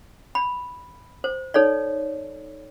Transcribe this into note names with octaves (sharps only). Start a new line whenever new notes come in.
B5
C5
D#4 A4 C#5 D5